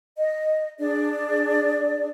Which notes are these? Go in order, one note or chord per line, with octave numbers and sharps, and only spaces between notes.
D#5
D4 G#4 D5